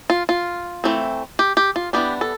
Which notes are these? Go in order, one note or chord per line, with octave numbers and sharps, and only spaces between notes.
F4
F4
E3 A3 C4
G4
G4
F4
E3 G3 B3 D4 G4
A4